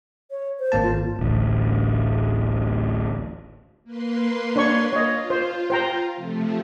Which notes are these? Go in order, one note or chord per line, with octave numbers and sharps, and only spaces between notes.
C#5
C5
G#1 A#3 A5
F4
D1 A1
A#3 B4 C6
D4 C#5 C#6
F4 C#5 D#5
C5
C5 G5 A#5
C3 F3 A3